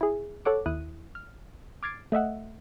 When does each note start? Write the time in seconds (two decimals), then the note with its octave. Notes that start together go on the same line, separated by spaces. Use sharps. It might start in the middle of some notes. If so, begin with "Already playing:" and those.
0.01 E4 G#4
0.45 A4 C#5 F#5 D6
0.66 D#2 E4 D#6 F#6 D#7
1.15 F6
1.83 D6 F6 G#6 A6 C7 D7
2.12 A3 D#5 E5 F#5